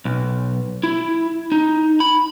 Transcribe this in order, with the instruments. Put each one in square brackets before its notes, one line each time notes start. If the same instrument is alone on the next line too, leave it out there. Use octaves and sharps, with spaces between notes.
[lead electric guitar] B1
E4
D#4
B5